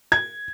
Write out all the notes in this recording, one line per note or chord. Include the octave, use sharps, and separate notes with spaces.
G#6